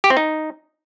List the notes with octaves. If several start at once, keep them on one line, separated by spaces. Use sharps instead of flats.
G4
C4
D#4